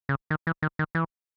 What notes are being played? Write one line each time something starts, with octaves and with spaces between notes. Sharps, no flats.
C#3
D#3
E3
D#3
D#3
E3